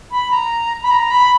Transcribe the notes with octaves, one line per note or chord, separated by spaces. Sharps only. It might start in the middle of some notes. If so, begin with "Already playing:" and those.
B5
A#5
B5
A#5
B5